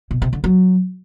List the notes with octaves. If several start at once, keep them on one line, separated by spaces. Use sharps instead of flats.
B2
C3
D3
F#3